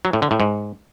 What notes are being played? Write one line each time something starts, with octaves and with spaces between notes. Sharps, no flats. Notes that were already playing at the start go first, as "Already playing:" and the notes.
F#3
A2
D3
A2
G#2